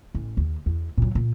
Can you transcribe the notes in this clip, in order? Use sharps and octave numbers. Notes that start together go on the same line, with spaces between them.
A1
D#2
E2
A#2 F#3
A#2